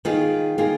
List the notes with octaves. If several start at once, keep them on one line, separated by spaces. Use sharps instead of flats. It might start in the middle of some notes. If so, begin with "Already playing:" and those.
D#3 A#3 F4 G#4
D#3 A#3 F4 G#4